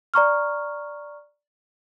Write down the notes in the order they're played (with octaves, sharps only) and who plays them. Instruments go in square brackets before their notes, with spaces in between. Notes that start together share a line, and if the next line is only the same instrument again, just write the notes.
[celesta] D5 A#5 C#6 F6